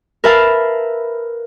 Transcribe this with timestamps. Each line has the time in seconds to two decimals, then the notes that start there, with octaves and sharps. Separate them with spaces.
0.24 A#4 B4 E5 F5 A5